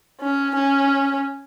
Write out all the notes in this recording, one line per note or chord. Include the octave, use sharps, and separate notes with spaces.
C#4
C#4